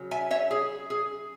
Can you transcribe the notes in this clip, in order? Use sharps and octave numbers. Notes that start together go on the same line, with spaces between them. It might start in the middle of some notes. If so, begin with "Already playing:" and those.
Already playing: C#3 F#3
E5 G#5
C#5 E5
G#4
G#4